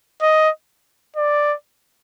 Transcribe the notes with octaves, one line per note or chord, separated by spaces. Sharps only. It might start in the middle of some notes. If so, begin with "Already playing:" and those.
D#5
D5